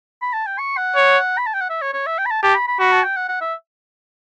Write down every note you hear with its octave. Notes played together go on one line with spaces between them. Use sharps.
B5
A5
G5
C#6
F#5
C#5
B5
A5
G5
F#5
E5
C#5
C#5
E5
G5
B5
A5
G4 A5
B5
B5
F#4 B5
A5
G5
F#5
F#5
E5